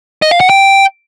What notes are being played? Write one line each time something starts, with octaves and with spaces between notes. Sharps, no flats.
D#5
F5
F#5
G5